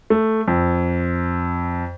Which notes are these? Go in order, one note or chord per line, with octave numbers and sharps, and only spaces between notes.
A3
F2